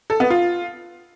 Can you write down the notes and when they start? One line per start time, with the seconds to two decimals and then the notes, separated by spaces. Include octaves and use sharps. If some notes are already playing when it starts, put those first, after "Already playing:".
0.10 A4
0.20 B3
0.30 F4